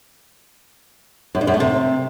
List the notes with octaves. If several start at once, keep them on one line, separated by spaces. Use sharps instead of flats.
F#2
G2
F#2
A3
C3